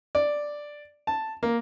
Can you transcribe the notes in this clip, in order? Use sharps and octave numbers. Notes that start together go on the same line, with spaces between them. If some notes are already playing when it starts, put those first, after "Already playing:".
D5
A5
A#3